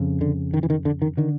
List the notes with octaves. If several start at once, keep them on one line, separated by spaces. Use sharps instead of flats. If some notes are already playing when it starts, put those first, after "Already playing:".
Already playing: F2 C#3
D3
D#3
E3
D#3
D3
D#3
D3 D#3